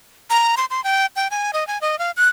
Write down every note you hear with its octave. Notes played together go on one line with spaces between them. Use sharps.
A#5
C6
C6
G5
G5
G#5
D#5
G#5
D#5
F5
F#6